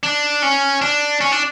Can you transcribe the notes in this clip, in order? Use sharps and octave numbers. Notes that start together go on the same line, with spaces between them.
D4
C#4
D4
C#4
D4